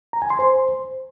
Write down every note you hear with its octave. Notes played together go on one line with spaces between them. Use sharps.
A#5
G#5
C6
C5